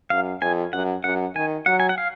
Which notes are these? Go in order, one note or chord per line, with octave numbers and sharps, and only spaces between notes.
F#2 F5
F2 G#5
F#2 F#5
F#2 F#5
D#3 G#5
F#3 F#5
G#5
F#5
F5